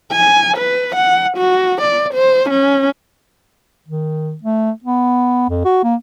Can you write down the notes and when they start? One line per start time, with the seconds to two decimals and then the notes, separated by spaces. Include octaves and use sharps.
0.12 G#5
0.58 B4
0.95 F#5
1.38 F#4
1.82 D5
2.14 C5
2.50 C#4
3.88 D#3
4.43 A3
4.84 B3
5.49 F2
5.65 F#4
5.83 A#3